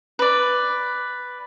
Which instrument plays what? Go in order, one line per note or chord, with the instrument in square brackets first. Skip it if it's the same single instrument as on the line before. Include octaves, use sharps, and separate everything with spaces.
[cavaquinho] B4 D5